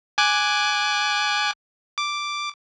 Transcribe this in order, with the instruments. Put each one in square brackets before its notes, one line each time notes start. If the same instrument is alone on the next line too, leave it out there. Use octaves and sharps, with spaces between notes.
[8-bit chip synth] G#5 D6 F#6
D6